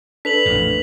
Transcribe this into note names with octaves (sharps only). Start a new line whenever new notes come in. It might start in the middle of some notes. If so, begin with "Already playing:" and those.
D4 A4 B4 B6 F7 F#7
A1 F2 A#2